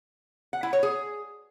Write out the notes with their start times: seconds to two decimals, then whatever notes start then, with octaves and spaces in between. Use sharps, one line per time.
0.53 F#5
0.63 E4
0.73 C#5
0.83 G#4